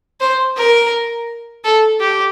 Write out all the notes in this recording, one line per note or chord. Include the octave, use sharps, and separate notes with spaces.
C5
A#4
A4
G4